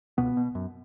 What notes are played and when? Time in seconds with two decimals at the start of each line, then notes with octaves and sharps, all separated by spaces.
0.18 C#2 B2 B3
0.37 B2
0.55 F#2